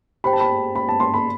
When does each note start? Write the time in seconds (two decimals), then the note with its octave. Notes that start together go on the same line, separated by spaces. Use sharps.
0.24 G4 C5 G5 B5
0.33 A5
0.40 B5
0.75 B5
0.88 A5
1.00 C6
1.14 B5